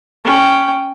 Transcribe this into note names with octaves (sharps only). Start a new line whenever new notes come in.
C#4 G5